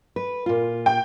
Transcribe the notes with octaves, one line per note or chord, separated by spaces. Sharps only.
B4
A#2 F4
G5